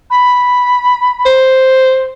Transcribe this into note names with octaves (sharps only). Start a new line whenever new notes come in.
B5
C5